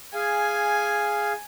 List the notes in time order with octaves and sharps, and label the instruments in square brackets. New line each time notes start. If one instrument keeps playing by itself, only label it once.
[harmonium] G#4 F5 [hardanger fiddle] G#5